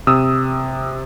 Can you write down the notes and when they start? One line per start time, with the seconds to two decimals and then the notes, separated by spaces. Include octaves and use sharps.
0.07 C3 D#6 E6